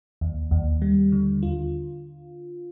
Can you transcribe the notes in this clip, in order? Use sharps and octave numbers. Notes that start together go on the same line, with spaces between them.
D#2
D#2
G3
D3
F4